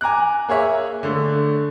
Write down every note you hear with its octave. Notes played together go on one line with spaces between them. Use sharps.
G#5 A#5 D6 F#6
A#3 G#4 C#5 E5
D3 A3